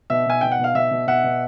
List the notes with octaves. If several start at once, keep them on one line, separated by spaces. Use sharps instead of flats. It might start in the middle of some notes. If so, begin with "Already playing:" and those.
B2 E5
B2 G#5
B2 G5
F#5
B2 F5
B2 E5
B2
B2 E5 F#5
B2